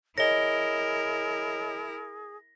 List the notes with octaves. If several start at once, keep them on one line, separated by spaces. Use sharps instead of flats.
E4 G#4 A#4 C#5 D#5 A#6 G7